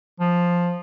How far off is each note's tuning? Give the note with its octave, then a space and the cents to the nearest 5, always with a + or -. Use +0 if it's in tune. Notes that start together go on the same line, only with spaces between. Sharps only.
F3 +5